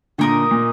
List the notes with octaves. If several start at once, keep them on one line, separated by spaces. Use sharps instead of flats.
A#2 D3 D#4 A#4 D#5
A#2